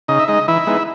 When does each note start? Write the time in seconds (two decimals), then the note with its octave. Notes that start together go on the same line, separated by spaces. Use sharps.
0.08 C#3 D#4 D#5
0.19 E5
0.28 G#3 D#4 D#5
0.48 E3 E4 E5
0.67 G#3 B3 D#4